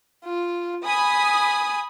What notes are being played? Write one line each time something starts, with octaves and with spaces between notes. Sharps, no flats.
F4
G#5 B5 D#6